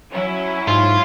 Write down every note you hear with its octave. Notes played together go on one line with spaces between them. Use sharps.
F#3 C#4 E4
G#2 F4